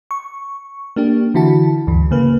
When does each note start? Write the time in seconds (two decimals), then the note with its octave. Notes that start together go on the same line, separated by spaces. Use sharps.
0.11 C#6
0.96 A#3 D4 G4
1.34 D3 E3 E4 F#4 A5
1.87 D2 G2 E3
2.11 C#3 A#3 B4